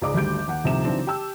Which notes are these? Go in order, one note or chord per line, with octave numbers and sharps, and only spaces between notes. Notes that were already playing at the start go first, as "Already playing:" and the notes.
C#2 G#2 G#4 D5 D#5 D6
G#1 D2 G3 G6 D7
D#2 F#5
D#1 C2 C3 F3 D#4 E7
C#3 E3 F#3 C4 D4 D#4
G4 G5 A5 E6